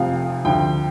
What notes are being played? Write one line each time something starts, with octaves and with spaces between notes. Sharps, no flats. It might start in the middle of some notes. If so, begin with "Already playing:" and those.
Already playing: F1 F2 F3 F5
D2 D3 F3 G5